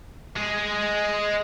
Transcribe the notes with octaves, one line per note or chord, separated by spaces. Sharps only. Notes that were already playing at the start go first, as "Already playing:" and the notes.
G#3 G#4